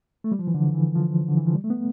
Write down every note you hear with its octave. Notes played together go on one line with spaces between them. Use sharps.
A3
G3
F3
E3
D3
E3
F3
D3
E3
F3
G3
A3
B3